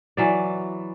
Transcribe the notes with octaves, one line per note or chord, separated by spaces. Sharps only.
E3 F#3 D5